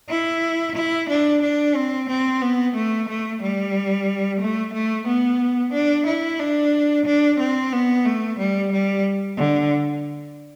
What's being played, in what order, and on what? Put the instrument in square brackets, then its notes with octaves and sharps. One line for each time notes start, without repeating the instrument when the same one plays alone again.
[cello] E4
E4
D4
D4
C4
C4
B3
A3
A3
G3
A3
A3
B3
D4
E4
D4
D4
C4
B3
A3
G3
G3
D3